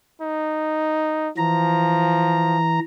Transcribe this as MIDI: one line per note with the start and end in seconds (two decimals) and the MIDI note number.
0.22 1.30 63
1.37 2.80 52
1.37 2.58 53
1.37 2.80 82